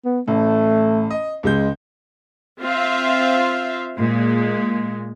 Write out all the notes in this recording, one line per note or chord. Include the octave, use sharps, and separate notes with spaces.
B3
A1 A3
D#5
C#2 G#3 G6
C4 F4 E5 F5
A#2 G#3